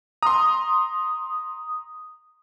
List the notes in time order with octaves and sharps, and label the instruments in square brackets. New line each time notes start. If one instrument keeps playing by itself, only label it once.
[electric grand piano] A#5 C6 [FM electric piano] D#6